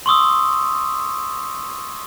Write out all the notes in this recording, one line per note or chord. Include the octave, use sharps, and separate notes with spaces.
C6 C#6 D#6 E6